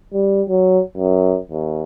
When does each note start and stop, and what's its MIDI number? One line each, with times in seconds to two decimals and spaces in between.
0.14 0.42 55
0.49 0.81 54
0.97 1.37 42
1.51 1.84 39